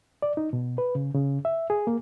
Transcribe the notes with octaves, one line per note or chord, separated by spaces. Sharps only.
D5
D#4
B2
B4
C#3
C#3
E5
G#4
A#3